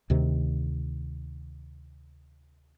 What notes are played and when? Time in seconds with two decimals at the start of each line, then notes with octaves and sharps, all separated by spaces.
0.10 D2 C3 D#3